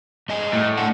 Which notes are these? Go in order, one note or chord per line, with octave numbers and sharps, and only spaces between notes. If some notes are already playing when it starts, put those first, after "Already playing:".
G2 D#5 G#5
A2
D4 F#5